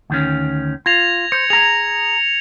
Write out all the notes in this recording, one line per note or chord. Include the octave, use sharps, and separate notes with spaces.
D2 D#3 C#4
F4 G#6 A#6 F7
C5 C#7
G#4 A#5 F7